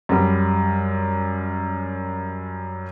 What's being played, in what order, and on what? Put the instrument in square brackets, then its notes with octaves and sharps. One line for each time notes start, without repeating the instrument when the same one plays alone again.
[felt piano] F#2 G3